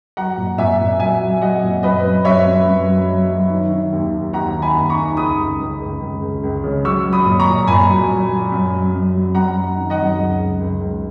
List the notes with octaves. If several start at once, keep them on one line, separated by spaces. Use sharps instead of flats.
F#3 F#5 A#5
A#2
A#2 E5 G#5
A#2
F#3 E5 G#5
F#3
F#3 D#5 F#5
A#2
F#2 B4 D#5
F#2
F#2 C#5 E5
F#2
F#2
F#3
F#3
F#3
D#3
D#3
D#2
D#2
D#2 F#5 A#5
D#3
G#5 B5
D#2
A#5 C#6
D#3
C#2 B5 D#6
C#2
C#2
C#2
C#2
C#2
C#2
C#3
F#3 C#6 E6
F#3
B5 D#6
A#2
A#5 C#6
A#2
A#2 G#5 B5
F#3
F#3
F#3
F#2
F#3
F#2
F#3
F#2 F#5 A#5
F#3
D#3
D#5 F#5
F#2
C#2
C#2
C#2
C#2